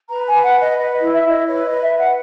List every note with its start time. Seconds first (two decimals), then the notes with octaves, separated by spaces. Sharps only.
0.08 B4 A#5
0.27 G#5
0.32 B4
0.43 F#5
0.55 B4
0.60 D#5
0.77 B4 D#5
0.94 D#5
1.01 E4
1.12 E5
1.23 E4
1.29 D#5
1.46 B4 C#5
1.64 D#5
1.70 B4
1.81 E5
1.93 B4 F#5